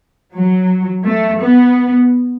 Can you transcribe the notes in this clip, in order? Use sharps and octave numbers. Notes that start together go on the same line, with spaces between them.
F#3
A3
B3